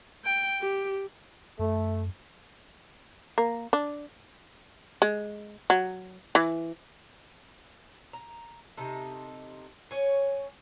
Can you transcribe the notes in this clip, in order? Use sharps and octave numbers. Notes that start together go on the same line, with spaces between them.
G5
G4
F#2 A3
A#3
D4
G#3
F#3
E3
A#5
C3 D#4 A4
C#4 C#5 G#5